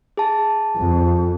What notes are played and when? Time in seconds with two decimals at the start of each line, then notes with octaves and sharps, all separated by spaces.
0.17 G#4 A5
0.77 F2